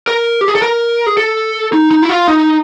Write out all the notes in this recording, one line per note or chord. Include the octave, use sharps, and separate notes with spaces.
A#4
G4
G#4
A4
A#4
G#4
A4
D#4
D#4
E4
F4
D#4